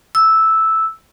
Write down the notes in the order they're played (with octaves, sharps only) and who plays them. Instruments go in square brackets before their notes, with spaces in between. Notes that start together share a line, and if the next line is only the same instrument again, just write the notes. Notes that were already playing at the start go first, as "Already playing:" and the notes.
[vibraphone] E6